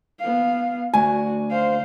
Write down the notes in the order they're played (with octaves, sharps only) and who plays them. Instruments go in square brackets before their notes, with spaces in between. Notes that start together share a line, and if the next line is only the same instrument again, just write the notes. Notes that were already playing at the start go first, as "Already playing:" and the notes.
[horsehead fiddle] B3 F5
[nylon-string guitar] D2 [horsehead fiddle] F#4 [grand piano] G#5
[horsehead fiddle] C5 F5